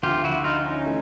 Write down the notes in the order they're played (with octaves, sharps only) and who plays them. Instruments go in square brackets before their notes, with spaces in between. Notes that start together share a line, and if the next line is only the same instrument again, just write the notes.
[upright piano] D2 D3 F3 [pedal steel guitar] F4 G4
[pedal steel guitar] E4 F#4
D#4 F4
C#4 D#4
[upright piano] E3 A3